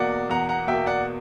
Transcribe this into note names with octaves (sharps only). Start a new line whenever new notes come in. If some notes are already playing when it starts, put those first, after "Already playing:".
Already playing: E2 B2 A#3 D5 F#5
E2 F#5 A#5
F#5 A#5
B2 A#3 E5 G5
D5 F#5